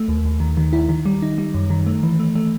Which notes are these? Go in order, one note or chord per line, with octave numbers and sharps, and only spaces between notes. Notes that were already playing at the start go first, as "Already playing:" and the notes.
Already playing: A3
D#2
D#2
D#3
D#3
E4
D#3
G3
D#4
G3
F#2
D#3
A3
E3
A3
A3